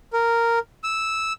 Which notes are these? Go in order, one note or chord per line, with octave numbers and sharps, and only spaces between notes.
A#4
E6